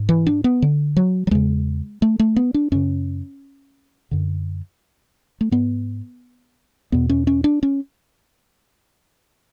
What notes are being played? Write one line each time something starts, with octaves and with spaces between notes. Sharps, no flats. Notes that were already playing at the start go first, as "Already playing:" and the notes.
Already playing: G#2
E3
D4
B3
D3
F#3
F#3
E2 C#3 G#3
A3
A3
B3
D4
F#2 C#3 C#4
F#2 D3
A3
G#2 B3
E2 B2 B3
C#4
C#4
D4
C#4